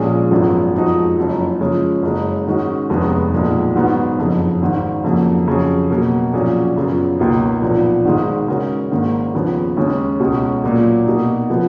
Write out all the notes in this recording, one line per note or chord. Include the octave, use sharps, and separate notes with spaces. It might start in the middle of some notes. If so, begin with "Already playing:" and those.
Already playing: A#1 A#2 G#3 C#4 G#4
G#1 F#2 F3 G#3 B3
F2 F3 G#3 D#4 F#4
F#1 F#2 F3
C#3 F3 G#3 C#4
F#1 F#2 C#3 G#3
G#2 D#3 G#3 C#4 F#4
F1 D#2 D#3 G#3 B3
B1 A#2 F3 G#3
G#2 D#3 F#3 B3 F#4
F#1 F2 C#3
G#1 G#2 D#3
F2 C#3 F#3 A#3
F2 C#3 F#3 C#4 G#4
B2 F#3 A#3
A#1 A#2 F#3 C#4 G#4
F#2 C#3 F#3 B3 F4
C#2 B2 A#3 D#4
B1 A#2 F3 B3
G#1 G#2 D#3 G#3
C#3 G#3 C#4 F#4 A#4
G#1 G#2 D#3 A#3
D#2 C#3 F3 B3
D#2 C#3 G#3 C#4
C#2 B2 G#3 C#4
A#2 F#3 A#3
B2 A#3 D#4
C#3 F3 B3